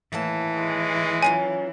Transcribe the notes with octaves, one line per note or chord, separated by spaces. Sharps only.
D#2 A2 E3 A5
G#3
F#3 C#4 F4 G#5